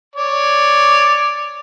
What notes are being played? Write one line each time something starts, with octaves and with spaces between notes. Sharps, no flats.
C#5 D5